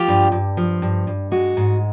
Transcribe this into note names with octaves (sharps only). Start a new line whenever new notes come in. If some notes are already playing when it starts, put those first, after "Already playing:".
Already playing: F3 F4 G4
G2
G2
F3
G2
G2
G#3 F#4
G#2